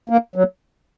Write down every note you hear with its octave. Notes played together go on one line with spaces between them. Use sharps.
A#3
F#3